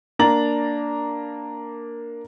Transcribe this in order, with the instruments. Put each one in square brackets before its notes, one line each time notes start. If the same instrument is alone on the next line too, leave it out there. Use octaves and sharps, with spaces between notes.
[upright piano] A#3 D4 A#5 A6 F#7